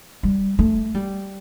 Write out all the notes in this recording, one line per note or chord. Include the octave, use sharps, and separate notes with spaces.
G3
A3
G3